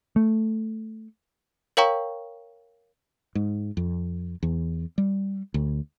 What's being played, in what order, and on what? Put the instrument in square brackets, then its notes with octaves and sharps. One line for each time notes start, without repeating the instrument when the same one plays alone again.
[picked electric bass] A3
[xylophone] A#4 C#5 F5 G5 A#5 C#6
[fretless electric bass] G#2
F2
E2
G3
D2